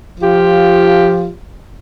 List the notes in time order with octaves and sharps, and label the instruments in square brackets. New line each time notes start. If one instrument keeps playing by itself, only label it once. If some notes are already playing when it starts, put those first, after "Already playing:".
[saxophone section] F3 F4 G4